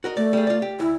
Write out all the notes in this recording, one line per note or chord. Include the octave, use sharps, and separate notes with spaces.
F#4 A#4 D#5
A3 D5
G3 G#4
F4 D5
G4
D2 E4